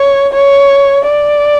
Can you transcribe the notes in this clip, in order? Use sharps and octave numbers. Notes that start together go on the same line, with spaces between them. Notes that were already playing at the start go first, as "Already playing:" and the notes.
Already playing: C#5
C#5
D5